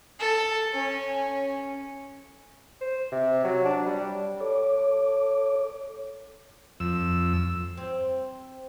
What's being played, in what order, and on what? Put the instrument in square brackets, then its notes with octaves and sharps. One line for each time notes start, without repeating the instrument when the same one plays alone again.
[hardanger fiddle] A4
C#4
[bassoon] C5
C3
F#3
D4
G3
[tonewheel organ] A4 C#5 D6
[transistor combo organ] F2 E6
[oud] C4